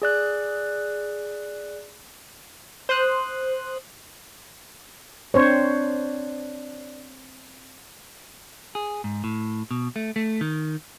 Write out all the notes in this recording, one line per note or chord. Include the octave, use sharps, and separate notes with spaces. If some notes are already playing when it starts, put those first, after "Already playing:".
G#4 D5 F#6
C5 C6 D#6 F#6
C4 D4 C5 C#5
G#4
G#2
A2
B2
A3
A3
D#3